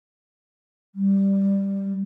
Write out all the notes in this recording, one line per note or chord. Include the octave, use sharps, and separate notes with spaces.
G3